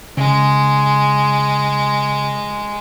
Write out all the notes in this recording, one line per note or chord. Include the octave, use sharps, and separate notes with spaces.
C#3 G#3